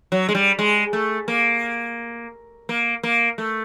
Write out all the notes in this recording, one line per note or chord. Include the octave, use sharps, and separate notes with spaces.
F#3
G#3
G3
G#3
A3
A#3
A#3
A#3
A3